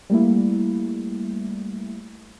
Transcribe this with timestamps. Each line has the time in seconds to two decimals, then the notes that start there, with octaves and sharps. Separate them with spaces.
0.10 G3 A3 A#3 E4